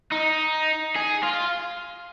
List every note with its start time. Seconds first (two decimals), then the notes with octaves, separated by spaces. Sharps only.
0.12 D#4
0.95 G#4
1.23 F4